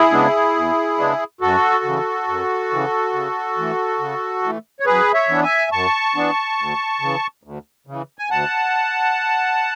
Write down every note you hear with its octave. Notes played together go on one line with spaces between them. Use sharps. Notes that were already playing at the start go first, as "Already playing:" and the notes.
Already playing: E4 G#4
C#3 G#3 B3 D4
E2
C#3 G#3 B3 D4
F#2 F#4 A4
C#3 E3
F#2
C#3 E3
C#3
E3 A3
C#3
E3 A3
C#5
F#2 G#4 B4
C#5 E5
E3 B3 D4
E5 G#5
F#2 A5 C#6
E3 B3 D4
D2
C#3 E3
D2
C#3 E3
G#5
D2 F#5 A5